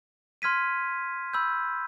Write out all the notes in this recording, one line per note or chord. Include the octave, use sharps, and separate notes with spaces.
C6 F6 G#6 B6 D#7
B5 E6 G6